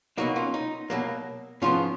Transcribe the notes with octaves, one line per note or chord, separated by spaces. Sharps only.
B2 F#3 A#3 D#4 F#4
C#4 F4
D#4
B2 F#3 A#3
G#2 F3 B3 C#4 F4